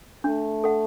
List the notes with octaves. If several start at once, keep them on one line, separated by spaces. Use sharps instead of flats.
A3 D4
A4 F#5